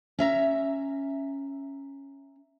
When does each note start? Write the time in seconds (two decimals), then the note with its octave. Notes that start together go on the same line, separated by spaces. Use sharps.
0.19 C#4 E5 A#5